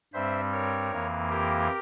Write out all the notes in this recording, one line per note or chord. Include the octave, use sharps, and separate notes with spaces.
G2 G3 C4 C5 E5
A#4 C#5
F2 E3 A#3
G4 A#4